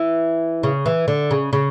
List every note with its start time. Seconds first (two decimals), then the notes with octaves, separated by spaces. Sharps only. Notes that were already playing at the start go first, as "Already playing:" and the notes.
Already playing: E3
0.63 C#3
0.86 E3
1.08 D3
1.31 C#3
1.53 C#3